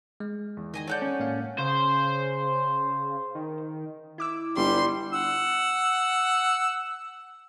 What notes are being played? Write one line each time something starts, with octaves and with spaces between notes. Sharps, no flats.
G#3
E2
D#3 D#5 G#5 A#5
A4 C#5 D5 F#5 G6
C#4
A2 A#3 F5
C#3 C5
D#3
E4 D6 E6
G1 G3 C6
F#5 E6